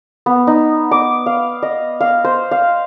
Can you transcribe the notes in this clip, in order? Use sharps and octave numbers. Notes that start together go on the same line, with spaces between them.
B3
D#4
D6
F5
D#5
F5
C5
F5